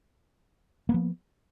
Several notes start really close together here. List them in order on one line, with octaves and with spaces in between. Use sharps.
A#3 B3 F3